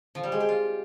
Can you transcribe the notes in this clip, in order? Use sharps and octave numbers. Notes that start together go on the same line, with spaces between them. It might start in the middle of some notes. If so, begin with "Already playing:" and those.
F3
G3
G#3
G4
F4